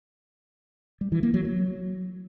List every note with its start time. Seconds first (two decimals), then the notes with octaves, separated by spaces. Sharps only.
1.01 G3
1.12 E3
1.23 A#3
1.34 F#3
1.45 F#3